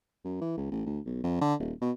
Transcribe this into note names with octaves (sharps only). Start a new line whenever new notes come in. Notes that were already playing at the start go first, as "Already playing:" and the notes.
F#2
E3
C#2
A1
D2
B1
F2
D3
D#1
B2